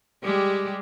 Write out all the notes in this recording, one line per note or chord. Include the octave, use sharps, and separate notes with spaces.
G3 G#3 G4